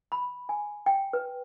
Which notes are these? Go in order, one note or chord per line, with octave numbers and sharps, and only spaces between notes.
B5
G#5
G5
B4